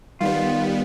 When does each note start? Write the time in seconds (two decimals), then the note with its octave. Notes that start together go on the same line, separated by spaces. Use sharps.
0.21 D#3 G3 B3 F4